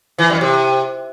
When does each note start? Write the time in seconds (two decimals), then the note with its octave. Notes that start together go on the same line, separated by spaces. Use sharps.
0.18 E3
0.30 F#2
0.41 C3